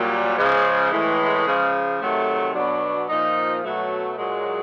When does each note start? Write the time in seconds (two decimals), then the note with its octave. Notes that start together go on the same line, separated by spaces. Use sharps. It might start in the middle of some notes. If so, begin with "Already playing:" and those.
Already playing: A#2 F#3 G3
0.37 C#3 F3 G#3
0.92 A2 E3
1.46 C#3 F3
2.00 C3 D#3 F#3 A3
2.54 B2 F#3 D4
3.08 A#2 F3 D#4
3.63 B2 F#3 A3
4.17 A#2 F#3 G#3